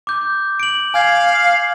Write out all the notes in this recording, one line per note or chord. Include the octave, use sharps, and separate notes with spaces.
D6 G6
D7 F#7
F5 G#5 F6 G#6